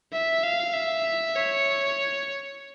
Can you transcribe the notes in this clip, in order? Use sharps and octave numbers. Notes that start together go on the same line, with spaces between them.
E5
F5
E5
C#5